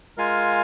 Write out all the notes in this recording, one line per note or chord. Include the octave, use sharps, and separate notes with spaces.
G#3 F4 A#4 F5 G#5